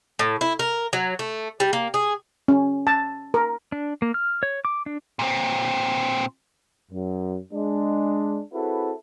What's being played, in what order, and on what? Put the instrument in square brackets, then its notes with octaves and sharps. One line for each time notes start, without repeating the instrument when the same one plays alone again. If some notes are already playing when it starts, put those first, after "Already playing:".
[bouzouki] A2
E4
A#4
F#3
A3
G3
A#3
G#4
[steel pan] C#4
A5
A#4
[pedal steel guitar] D4
A#3
F6
C#5
D6
D4
[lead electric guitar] A#2 C4
[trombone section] F#2
G#3 D4
C4 E4 F#4 G#4 A4 B4